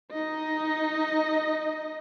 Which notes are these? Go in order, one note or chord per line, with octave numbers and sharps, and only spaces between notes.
D#4 D#5